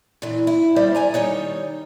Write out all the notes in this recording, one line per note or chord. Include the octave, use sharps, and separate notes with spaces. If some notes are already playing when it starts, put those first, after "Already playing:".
A#2 E3
E4
A#2 G3 G4 C5 D5 E5
D5 G#5 A#5
D#3 G3 D#4 C#5